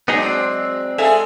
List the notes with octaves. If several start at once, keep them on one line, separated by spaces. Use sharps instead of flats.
F#3 G#3 B3 D4 D#4 G#4
C4
G#3 G#4 A4 E5 F5 G#5